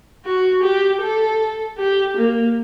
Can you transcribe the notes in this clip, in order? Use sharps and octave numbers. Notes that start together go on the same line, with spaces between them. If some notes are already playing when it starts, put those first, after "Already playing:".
F#4
G4
A4
G4
A#3